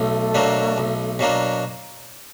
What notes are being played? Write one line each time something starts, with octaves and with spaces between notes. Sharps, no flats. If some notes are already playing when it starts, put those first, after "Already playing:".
Already playing: B1 A3
B2 F#3 A#3 D4
B1
B2 F#3 A#3 D4